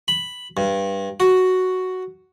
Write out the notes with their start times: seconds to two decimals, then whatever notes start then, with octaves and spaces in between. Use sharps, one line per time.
0.08 B5
0.57 G2
1.20 F#4